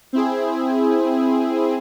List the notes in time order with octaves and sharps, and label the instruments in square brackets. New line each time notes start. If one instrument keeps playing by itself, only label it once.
[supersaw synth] C4 E4 G#4